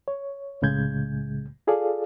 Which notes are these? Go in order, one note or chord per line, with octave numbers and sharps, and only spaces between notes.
C#5
C2 A2 C#3 G#3 G6 G#6
F4 G#4 A4 D5 F5